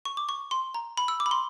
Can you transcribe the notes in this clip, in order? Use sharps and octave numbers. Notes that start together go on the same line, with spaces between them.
C#6
D6
C#6
C6
A#5
B5
E6
D6
B5
C6